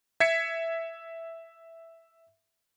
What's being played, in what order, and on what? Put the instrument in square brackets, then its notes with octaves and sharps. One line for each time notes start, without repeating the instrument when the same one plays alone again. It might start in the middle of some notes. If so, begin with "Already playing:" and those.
[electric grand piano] E5 G#6 B6 C#7